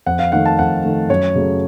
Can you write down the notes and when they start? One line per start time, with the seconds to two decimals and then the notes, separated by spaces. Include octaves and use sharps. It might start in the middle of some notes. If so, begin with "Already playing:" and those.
0.06 F2 F#5
0.19 F5
0.32 D#3 A3 F#5
0.46 A5
0.59 F2 F#5
0.84 D#3 A3
1.09 F#2 C#5
1.35 C#3 F#3 A3